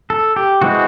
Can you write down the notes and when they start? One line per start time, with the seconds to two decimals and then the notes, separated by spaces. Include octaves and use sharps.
0.10 A4
0.36 G4
0.61 E3 G#3 C4 F#4